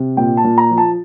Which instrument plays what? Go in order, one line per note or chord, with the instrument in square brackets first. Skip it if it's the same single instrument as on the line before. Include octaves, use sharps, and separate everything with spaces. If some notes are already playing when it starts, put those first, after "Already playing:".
Already playing: [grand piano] C3
A#2 G5
A5
A#2
A#5
F3
A5